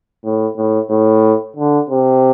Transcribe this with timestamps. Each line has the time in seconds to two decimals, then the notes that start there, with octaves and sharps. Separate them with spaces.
0.24 A2
0.57 A2
0.90 A2
1.56 D3
1.89 C3